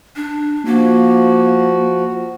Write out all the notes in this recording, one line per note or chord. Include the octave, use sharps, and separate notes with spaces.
D4
F3 A#3 F#4